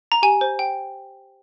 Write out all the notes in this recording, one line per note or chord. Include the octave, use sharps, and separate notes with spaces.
A#5
G4 G#5
C5
G5